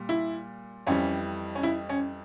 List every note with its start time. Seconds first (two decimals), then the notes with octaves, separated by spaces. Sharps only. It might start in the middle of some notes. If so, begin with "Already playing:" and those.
Already playing: A#2 G3
0.09 E4
0.87 F2 E3 G3 C#4
1.55 C#4
1.63 E4
1.89 C#4